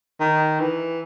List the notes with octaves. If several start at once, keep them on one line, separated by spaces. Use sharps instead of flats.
D#3
E3